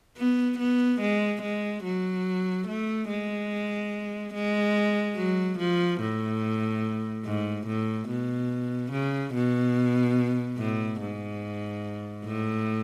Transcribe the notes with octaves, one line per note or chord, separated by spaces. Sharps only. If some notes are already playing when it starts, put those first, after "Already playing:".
B3
B3
G#3
G#3
F#3
A3
G#3
G#3
F#3
F3
A2
G#2
A2
B2
C#3
B2
A2
G#2
A2